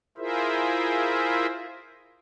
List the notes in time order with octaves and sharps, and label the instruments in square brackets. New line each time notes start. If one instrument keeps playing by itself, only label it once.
[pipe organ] E4 F4 G#4 A#4 C5 E5